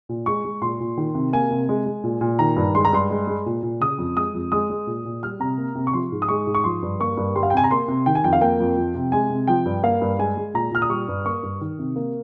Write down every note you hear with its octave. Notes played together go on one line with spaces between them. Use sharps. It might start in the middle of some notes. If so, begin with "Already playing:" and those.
A#2
G#3 C#6
G#3
A#2 C6
A#2
D#3
C3
A#3 G#5
C3
G#3
G#3
A#2
A#2
D#3 A#5
G2
G#3 C6
A#5
G2 C6
G#3
G#3
A#2
A#2
C#3 D#6
F2
G#3 D#6
F2
G#3 D#6
G#3
A#2
A#2
G3 F6
C3 A#5
A#3
C3
C#6
F3 C6
G#2
D#6
G#3 C#6
G#2
C#6
F3 C6
G2
A#3 C#6
G2
G3 C6
F5
G5
C3 G#5
A#5
A#3 C6
C3
D#3 G5
G#5
F2 G5
F5
A#3 G5
F2
F3
C3
G#3 G#5
C3
F3 G5
G2
A#3 F5
G2
G#3 G#5
G#3
A#2 A#5
A#2 F6
D#6
G3 C#6
G2
A#3 C#6
G2
D#3
C3
A#3